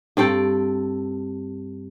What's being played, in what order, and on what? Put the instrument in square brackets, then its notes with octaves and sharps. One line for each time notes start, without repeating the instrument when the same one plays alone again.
[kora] G2 C4 A4 G5